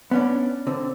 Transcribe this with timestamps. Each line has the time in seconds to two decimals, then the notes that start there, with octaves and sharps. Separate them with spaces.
0.11 B3 C#4 D4
0.67 D3 C4